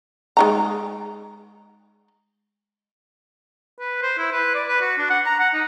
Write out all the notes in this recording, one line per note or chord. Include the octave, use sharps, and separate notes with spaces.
G#3 D#4 A#5
B4
C5
E4
B4
D5
B4
F#4
D4
F#5
A#5
F#5
D#4